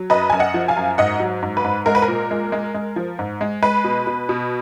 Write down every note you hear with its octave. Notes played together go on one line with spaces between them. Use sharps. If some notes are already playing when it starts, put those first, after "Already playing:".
Already playing: F#3
F#2 B4 D#5
F#2 G#5
D#5 F#5
F3
F5 G#5
F#2
G#2 D#5 F#5
F#3
G#2
B4
G#2
G#3 A#4
B4
A#4
A#2
G#3
G#3
G#3
F3
G#2
G#3
G#3 B4
B2
B2
B2